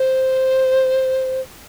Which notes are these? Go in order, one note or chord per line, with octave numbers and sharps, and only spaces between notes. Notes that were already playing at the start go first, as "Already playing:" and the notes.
Already playing: C5